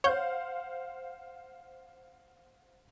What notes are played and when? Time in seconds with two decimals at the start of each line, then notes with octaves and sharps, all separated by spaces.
0.04 C5 C#5 F5 F#5 G6